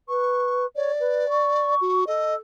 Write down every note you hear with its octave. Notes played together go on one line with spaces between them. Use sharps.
B4 C#6
C#5 D5
B4
C#6
F#4
A4 D#5